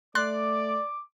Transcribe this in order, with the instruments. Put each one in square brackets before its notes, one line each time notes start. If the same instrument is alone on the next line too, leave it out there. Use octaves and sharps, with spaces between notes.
[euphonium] A3 [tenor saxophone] D5 [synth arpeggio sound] C6 F#6 A6 [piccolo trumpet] D6